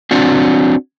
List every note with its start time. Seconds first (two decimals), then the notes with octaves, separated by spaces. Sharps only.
0.11 C4 D4 F#4